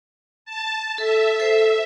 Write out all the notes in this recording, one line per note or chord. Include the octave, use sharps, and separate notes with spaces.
A5
A4 E5
A4 C5